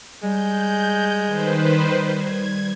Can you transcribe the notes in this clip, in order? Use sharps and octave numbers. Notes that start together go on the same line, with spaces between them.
G3 G#3 G6
D#3 B4 C5
G#6